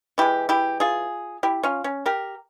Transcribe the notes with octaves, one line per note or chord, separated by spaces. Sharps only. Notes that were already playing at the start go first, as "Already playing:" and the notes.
E3 G#3 E4 G4
E4 G4
F4 G#4
E4 G4
C#4 F4
C#4
G4 A#4